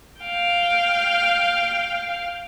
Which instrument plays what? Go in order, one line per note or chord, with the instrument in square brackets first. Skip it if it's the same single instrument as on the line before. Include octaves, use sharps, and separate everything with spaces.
[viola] F5 G5